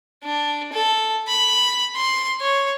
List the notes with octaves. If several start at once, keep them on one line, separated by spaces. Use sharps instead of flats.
D4
A4
B5
C6
C#5